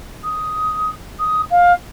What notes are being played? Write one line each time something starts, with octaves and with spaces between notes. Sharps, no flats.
D#6
D#6
F5